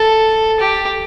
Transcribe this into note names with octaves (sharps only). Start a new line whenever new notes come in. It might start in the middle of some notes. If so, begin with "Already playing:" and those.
Already playing: A4
G4